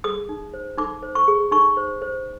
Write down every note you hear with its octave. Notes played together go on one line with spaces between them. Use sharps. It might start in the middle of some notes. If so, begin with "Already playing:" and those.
G#4 D#6
D#4
C5
D#4 D6
C5
C#6
G#4
D#4 C#6
C5
C5